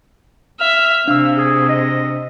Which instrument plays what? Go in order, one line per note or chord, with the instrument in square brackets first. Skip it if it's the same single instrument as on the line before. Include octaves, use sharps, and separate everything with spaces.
[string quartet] E5 [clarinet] F6
[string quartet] C3 [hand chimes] D4 E6 [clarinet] F5
[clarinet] G#4
D#5